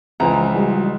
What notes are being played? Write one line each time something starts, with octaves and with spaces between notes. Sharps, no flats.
C#2 E3 F3 B4 A#5
F3 G3 G#3 F#4